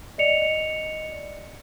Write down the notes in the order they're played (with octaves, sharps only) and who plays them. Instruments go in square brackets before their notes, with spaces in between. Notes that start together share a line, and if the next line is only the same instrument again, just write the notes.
[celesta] D5 D#5 C#7 F7